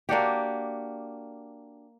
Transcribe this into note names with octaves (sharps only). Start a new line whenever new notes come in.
A#3 D4 F#4 G4